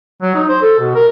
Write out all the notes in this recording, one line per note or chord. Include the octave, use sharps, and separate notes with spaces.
F#3
D#4
C5
A4
B2
A#4